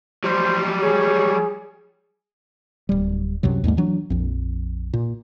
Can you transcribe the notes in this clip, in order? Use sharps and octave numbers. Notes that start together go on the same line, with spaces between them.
F#3 G3 C5
G#4 C#5
D1 G3
C2 F#2 C3 F#3
D#2 G#2 G3 A3
E3 F#3 D4
A#1 F2
A#2